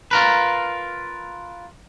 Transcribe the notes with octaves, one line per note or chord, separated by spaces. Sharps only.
F4 A#4 B4